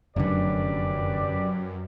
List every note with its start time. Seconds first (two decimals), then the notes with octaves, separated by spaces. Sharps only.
0.16 F1 F#2 D3 G4 B4 D5